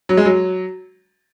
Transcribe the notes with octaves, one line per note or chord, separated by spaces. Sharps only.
F#3
G#3
F#3